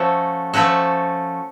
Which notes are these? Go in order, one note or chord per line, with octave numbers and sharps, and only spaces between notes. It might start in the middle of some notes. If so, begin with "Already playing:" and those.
Already playing: F3 A3 C#4 F#4 A4
F3 A3 C#4 F#4 A4